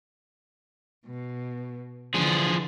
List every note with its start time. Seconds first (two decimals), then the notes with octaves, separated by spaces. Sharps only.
1.07 B2
2.14 D3 E3 F3 G#4